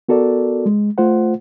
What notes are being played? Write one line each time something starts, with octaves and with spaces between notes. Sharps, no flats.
B3 F#4 A4 A#4 D5
G#3
A3 F4 C5 F#5